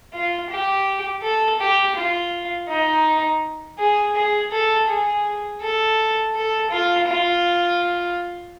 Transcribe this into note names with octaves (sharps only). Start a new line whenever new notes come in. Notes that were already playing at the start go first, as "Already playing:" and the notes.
F4
G4
A4
G4
F4
D#4
G#4
G#4
A4
G#4
A4
A4
F4
F4